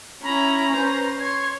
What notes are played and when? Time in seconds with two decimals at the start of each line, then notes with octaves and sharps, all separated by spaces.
0.23 C#4 E4 A#5 B5
0.74 C#4 B4 C5
1.20 C#5 C6 G#6